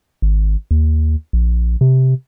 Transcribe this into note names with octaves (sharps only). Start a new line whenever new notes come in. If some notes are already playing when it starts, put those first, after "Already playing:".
G#1
D#2
A#1
C3